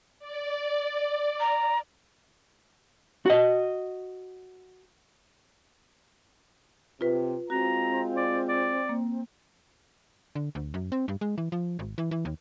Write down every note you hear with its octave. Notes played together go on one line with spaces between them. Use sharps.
D5
A#5
F#4 D#5
C3 F4 B4
G#3 C4 F4 F#4 A#5
D5
D5
A#3
D3
D2
F#2
C4
G2
G#3
E3
F3
G#1
E3
E3
D#2